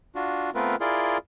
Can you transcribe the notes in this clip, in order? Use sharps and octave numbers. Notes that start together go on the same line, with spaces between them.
D4 F4 F#4
A3 B3 C4 F4 A#4 B4
E4 F4 G#4 A#4 D5 C6